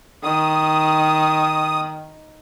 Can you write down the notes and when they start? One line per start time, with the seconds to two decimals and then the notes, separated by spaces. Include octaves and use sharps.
0.23 D#3 D#6